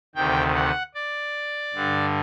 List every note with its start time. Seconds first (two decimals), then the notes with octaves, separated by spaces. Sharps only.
0.15 D2 C3 D#3 G5
0.55 F#5
0.94 D5
1.74 G2 D3